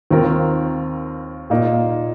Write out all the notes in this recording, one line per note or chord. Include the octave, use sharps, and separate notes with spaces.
D#2 D#3 C4 F4 A#4
A#2 A#3 D#4